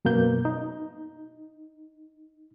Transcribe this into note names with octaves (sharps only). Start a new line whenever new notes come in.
F#2 B2 A#3 G6
D#4